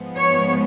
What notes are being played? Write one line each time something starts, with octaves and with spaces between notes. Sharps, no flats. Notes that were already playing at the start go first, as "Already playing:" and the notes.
Already playing: G#2 F3 G#3 B3
C#5